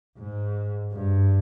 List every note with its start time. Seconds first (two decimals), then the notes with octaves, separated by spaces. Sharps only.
0.18 G#2
0.93 G2